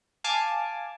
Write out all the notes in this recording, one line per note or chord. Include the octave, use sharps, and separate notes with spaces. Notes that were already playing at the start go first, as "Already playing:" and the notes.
F5 G#5 A5 D6